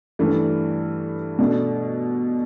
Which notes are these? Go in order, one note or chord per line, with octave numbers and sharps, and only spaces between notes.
G2 E3 A3 D4
B2 A3 D4